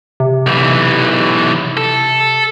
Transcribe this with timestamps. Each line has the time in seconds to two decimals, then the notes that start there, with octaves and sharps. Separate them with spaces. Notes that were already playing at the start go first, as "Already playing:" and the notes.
0.20 C3
0.47 B1 E3
1.77 A4